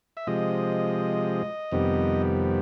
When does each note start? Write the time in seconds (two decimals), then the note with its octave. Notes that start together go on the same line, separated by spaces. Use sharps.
0.17 E5
0.27 C3 F3 G#3 D#5
1.72 F2 C3 D#3 G3 B3